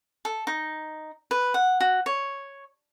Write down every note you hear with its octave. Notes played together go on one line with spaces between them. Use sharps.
A4
D#4
B4
F#5
F#4
C#5